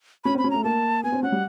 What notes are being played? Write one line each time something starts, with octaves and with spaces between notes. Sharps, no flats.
C#4 B5
C4 B5
C#4
A3 A#5
A#3 A5
B3 G#5
C4
C#4 F#5
G3